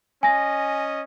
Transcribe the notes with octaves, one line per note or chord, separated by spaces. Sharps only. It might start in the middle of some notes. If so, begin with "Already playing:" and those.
C#4 D#5 G#5 A#6